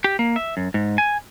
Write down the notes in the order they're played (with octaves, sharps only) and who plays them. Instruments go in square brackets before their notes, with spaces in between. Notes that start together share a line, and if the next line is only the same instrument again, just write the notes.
[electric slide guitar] G4
A#3
E5
F#2
G#2
G#5